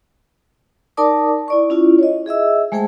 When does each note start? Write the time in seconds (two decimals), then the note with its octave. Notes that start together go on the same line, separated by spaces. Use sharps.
0.97 D#4 A#4 D5 A5 D6 D#6
1.48 E4 D5 C#6
1.70 C#4 E4 F4
1.99 C#5 D#5
2.26 G#4 D#5 E5 E6
2.72 G#3 A3 G#4 C5 G5 A5